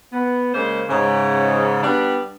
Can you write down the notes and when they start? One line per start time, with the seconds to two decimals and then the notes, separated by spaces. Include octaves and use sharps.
0.12 B3
0.54 C#3 G#3 A#3 C5
0.90 G#2 C#3
1.83 G3 B3 D4